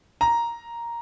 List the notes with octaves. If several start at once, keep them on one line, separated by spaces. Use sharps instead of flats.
A#5